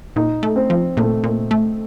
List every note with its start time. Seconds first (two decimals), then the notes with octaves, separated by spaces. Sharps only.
0.16 A#2 D#4
0.43 A3
0.56 C4
0.70 F3
0.97 A#2 A3
1.24 A#2
1.51 A3